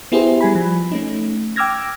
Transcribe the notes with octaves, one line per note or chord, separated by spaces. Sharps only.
B3 E4 G4 G#4 C5
G3 G#5 B5
F3
A3 C#4 D#4
G5 D6 E6 F6 G#6 A#6